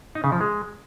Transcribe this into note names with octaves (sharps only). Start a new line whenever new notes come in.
D#4
C#3
F3
G#3